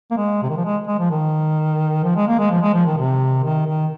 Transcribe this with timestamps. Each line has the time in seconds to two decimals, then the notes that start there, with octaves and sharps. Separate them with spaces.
0.11 A#3
0.17 G#3
0.42 C3
0.50 D#3
0.57 F3
0.64 G#3
0.88 G#3
0.99 F3
1.10 D#3
2.04 F3
2.16 G#3
2.28 A#3
2.39 G#3
2.51 F3
2.62 G#3
2.74 F3
2.85 D#3
2.97 C3
3.44 D#3
3.67 D#3